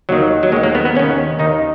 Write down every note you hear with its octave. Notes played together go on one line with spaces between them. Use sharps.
D#2 D#3 F#3
F#3
D#2 D#3 G#3
A#3
B3
B3
D#2 D#3 C#4
D#2 D#3 D#4